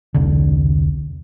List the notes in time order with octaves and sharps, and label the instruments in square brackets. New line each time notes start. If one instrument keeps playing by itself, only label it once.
[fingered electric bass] E1 C2 D3